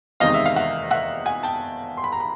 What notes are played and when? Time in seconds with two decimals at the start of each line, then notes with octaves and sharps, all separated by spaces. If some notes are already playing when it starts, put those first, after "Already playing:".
0.20 E2 C3 D#3 G#3 D#5 F5
0.34 E5
0.46 F5
0.56 E5 F#5
0.91 E5 F#5
1.26 F#5 G#5
1.43 G5 A5
1.97 C6
2.04 B5
2.12 A#5
2.20 B5